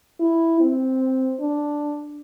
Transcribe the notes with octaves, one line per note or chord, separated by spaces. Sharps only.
E4
C4
D4